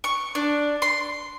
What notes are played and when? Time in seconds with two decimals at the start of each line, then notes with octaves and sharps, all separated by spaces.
0.04 C#6
0.35 D4
0.82 C6